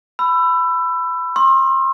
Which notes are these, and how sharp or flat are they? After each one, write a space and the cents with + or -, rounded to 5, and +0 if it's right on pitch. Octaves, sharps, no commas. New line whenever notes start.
B5 +15 E6 +25
C6 +40 D#6 +0